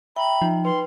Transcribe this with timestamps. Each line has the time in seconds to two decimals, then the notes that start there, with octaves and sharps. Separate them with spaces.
0.16 E5 G5 A#5 B5
0.42 F3 D#4
0.65 B4 C6